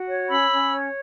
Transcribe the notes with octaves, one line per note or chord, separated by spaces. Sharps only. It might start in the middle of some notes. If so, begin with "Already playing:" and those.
Already playing: F#4
C#5
C#4 B5 E6
C#4
C#5